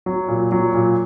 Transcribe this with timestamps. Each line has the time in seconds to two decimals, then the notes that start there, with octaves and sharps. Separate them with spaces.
0.06 F#3
0.28 A#2
0.52 F#3
0.74 A#2